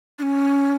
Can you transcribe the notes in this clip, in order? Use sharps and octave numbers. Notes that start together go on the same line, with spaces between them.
D4
C#4